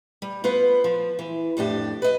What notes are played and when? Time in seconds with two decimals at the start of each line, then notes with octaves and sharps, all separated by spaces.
0.22 G3
0.44 B3 F4 B4 C5
0.84 F3
1.19 E3
1.57 F2 A2 D4 G4
2.02 B4 D#5